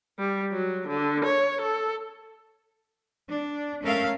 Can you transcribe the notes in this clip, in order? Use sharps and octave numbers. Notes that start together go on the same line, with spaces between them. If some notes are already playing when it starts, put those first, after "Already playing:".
G3
F#3
D3
C#5
A4
D4
A3 C#4 A#4 E5 F5